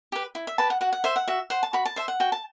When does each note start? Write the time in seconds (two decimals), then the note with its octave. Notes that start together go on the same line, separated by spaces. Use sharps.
0.12 G4 B4
0.35 E4
0.47 E5
0.58 G4 B4 A5
0.70 F#5
0.81 F#4 F#5
0.93 F#5
1.04 C5 E5
1.16 F#5
1.28 F#4 E5
1.50 C5 F#5
1.63 A5
1.73 F#4 B5
1.85 A5
1.96 C5 E5
2.08 F#5
2.20 F#4 G5
2.32 A5